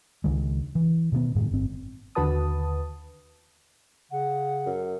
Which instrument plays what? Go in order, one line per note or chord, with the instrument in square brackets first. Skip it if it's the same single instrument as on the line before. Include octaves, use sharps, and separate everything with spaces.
[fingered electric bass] C#2 D#3 G#3
E3
B2 D#3 E3 B3
F#2 A2 D#3 G#3
G1 C4
[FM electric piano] D#2 D3 F#4 B4 A5 D#6
[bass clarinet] C#3 [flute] F#5
[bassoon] F#2